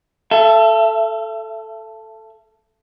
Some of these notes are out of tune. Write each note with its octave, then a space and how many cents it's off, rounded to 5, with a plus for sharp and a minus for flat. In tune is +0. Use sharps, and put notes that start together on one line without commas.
A4 +0 E5 +35